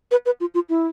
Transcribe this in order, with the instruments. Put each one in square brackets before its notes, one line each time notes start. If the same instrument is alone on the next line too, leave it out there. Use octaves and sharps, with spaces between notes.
[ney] B4
B4
F4
F4
E4